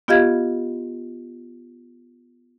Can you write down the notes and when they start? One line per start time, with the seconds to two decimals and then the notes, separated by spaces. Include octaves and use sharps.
0.08 B3 F4 G4 D#5 F5 G#6